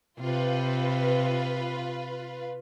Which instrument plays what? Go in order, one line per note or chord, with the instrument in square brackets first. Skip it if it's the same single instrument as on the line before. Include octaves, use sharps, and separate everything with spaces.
[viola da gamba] C3 [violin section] F4 B4